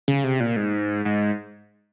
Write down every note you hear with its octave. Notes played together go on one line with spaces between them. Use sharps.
C#3
C3
A#2
G#2
G#2